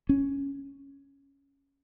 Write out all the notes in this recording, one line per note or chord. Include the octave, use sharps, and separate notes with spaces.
C#4